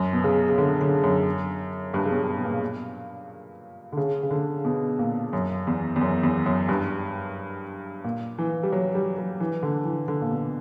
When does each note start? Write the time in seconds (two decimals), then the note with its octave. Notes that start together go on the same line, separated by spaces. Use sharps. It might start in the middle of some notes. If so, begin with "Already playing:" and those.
Already playing: F#2
0.13 B2
0.24 C#3
0.49 C#3
0.58 D3
0.81 D3
1.04 F#2
1.94 G2
2.05 C#3
2.10 B2
2.37 B2
2.45 A#2
3.93 D3
3.97 C#3
4.23 C#3
4.31 D3
4.65 B2
4.99 A#2
5.33 F#2
5.67 E2
5.96 E2
6.01 F#2
6.23 E2
6.46 F#2
6.68 G2
8.04 A#2
8.38 E3
8.63 G3
8.72 F#3
8.95 G3
9.18 F#3
9.40 E3
9.63 D3
9.85 E3
10.08 D3
10.22 A#2
10.31 B2